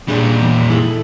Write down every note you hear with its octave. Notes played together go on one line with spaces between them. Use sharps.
A#2 G3 D4 G#4
E2
E4 G#4 A4